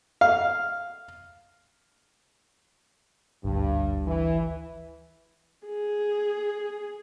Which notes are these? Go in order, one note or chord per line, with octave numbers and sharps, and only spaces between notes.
F5
G#1 D2 G2
E3
G#4